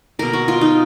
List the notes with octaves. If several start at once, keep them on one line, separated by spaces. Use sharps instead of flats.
B2 A#3 A#4
F#4
F4
D#4